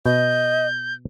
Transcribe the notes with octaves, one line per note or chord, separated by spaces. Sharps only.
B2 D#5 G6